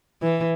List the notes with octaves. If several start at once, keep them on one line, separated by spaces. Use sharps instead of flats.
E3